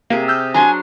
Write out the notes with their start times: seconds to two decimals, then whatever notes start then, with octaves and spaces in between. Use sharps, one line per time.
0.10 C3 A#3 G4 G#4
0.28 E6 F6 G6
0.54 F#3 D4 G#5 A#5 C6